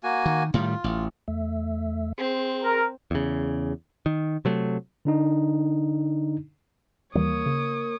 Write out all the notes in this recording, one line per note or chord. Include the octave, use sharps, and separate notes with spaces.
A#3 F#4 G#5
D#3
A2 D#3 G3 F4
A1
E2 A3 E5
C4 G#4 C6
A#4
E2 C#3
D#3
C3 F#3 A3
D3 D4 D#4
D#2 E3 G3 A#3 C#5 D#6
C#3